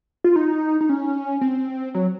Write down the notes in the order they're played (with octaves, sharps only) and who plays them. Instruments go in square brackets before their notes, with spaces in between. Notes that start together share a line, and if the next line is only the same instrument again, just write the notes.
[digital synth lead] F4
D#4
D#4
C#4
C4
F#3